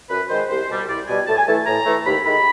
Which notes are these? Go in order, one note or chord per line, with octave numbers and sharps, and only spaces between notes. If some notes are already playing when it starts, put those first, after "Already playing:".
F#2 B4
D#3 G#3 C5
C2 C5
B2 G3
C2 D5
B2 G3 G#5
A2 A5
G#5
E3 A3 A5
A2 A#5
E3 A3
D#2 B5
D#3 G#3 B5